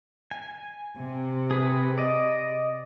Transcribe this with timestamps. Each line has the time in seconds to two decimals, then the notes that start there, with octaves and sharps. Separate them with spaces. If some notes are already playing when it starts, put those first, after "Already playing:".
0.31 G#5
0.99 C3
1.51 G#4 B4
1.98 D5 D#5